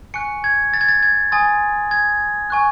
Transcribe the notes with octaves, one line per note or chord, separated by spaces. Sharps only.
G#5 C#6 F#6 C#7
G#6
A6
G#6
A6
G#6
G#5 C6 D#6 A6
G#6
G#5 C#6 F#6